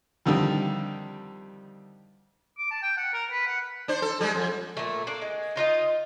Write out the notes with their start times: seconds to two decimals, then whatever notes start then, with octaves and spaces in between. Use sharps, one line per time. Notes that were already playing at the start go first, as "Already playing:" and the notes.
0.26 F2 D3 D#3 G3
2.58 D6
2.71 A5
2.82 G5
2.97 F#5
3.13 A#4
3.31 B4
3.47 F#5
3.88 D4 C5
4.02 A4
4.21 G3 G#3
4.35 F2
4.77 A#2 A3
5.07 A#3 D4
5.22 G#3
5.56 D#4 F4 A#4 D#5